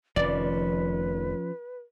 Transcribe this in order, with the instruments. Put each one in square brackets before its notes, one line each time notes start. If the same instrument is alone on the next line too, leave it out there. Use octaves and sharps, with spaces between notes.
[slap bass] F1 D#3 [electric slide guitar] F3 C#4 [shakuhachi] B4 [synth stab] D5